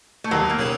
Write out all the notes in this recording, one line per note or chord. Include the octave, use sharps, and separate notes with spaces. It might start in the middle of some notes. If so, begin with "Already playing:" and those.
A3
D#2 F#3
F#3 A#3
C#3